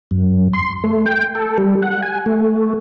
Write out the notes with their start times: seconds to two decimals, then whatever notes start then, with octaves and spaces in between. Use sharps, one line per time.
0.11 F#2
0.53 C6
0.84 A3
1.06 G5
1.35 A4
1.58 G3
1.82 F#5
2.02 G#5
2.26 A3